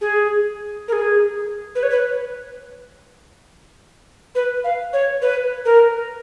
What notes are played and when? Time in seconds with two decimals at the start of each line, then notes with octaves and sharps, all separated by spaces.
0.01 G#4
0.88 A#4
0.93 G#4
1.75 B4
1.83 C#5
1.90 B4
4.35 B4
4.64 F5
4.93 C#5
5.22 B4
5.65 A#4